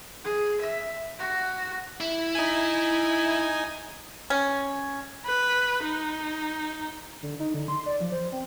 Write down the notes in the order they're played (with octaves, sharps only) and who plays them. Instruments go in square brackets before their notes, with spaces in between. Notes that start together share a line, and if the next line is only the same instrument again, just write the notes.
[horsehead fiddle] G#4
E5
F#4
[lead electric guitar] E4
[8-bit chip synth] D#4 G#5
[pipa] C#4
[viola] B4
D#4
[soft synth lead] D3
D#4
D3
C6
D5
F3
C5
C4